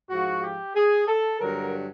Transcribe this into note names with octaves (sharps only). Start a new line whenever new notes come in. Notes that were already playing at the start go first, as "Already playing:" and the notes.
G#2 F3 F#4
G4
G#4
A4
G2 D3 F#3 A#4